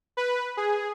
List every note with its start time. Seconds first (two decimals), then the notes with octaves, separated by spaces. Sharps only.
0.17 B4
0.57 G#4